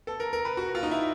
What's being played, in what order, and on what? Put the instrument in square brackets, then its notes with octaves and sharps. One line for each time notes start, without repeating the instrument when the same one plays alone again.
[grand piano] A4
A#4
A#4
B4
F#4
F4
D#4
E4